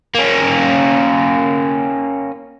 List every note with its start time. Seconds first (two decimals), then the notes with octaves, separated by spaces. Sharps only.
0.15 A#3 C#4